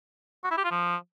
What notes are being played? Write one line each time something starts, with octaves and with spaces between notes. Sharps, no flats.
F#4
E4
G4
F4
F3